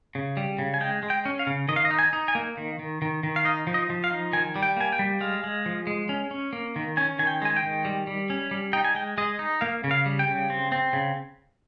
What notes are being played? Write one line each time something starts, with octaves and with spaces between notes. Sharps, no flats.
C#3
G3
C#3
G#5
G#3 G5
G#3
G5
C#4
F5
C#3
D#3 D#5
F5
D#5
D#4
G#5
D#4
G#5
A#3
D#3
D#3
D#3
D#3
F5
D#4 D#5
F3
D#5
F3
F5
D#4
D#3 G#5
G3
G5
A#3 G#5
G5
G3
G#3 F5
G#3
F3
G#3
C#4
C#4
A#3
D#3
C#4 G#5
D#3 G#5
G5
G#3 G#5
G5
D#3
G3
G3
C#4
G3
D#4 G5
G#5
G#3 G5
G#3 D#5
D#4
A#3 F5
C#3
F5
G3
G5
C#3
C4
C4
C#3